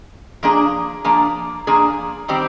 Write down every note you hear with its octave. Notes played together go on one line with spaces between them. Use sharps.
F3 A#3 D4 G#4
F3 A#3 D4 G#4
F3 A#3 D4 G#4
D#3 G3 C4 G4 C5